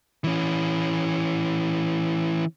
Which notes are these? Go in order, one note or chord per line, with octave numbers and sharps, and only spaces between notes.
E3 C#4